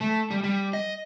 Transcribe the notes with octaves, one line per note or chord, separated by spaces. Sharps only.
A3
G3
G3
D#5